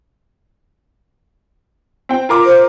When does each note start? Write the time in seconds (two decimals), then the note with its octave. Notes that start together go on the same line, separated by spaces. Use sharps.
2.09 C4 G5
2.29 F4 A#4 D6
2.45 C5